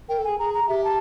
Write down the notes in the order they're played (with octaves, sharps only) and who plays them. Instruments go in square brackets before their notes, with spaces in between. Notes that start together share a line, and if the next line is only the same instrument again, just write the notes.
[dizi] A#4 [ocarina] G5
[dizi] A4
[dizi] G#4 [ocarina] G#5
[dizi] G#4 [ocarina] A#5
[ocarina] A#5
[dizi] G4 [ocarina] E5
[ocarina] A5